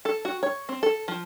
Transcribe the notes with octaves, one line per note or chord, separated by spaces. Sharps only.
A4
F#4
C#5
C4
A4
F3